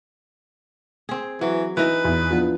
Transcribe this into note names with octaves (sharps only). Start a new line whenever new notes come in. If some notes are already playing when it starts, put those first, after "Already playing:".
C4 G#4
E3 F#3
E3 D#4 B4
E2
F3 B3 D4